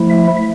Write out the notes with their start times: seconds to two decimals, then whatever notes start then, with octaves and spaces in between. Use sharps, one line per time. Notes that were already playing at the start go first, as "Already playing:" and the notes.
Already playing: F3 A3 E4
0.10 E5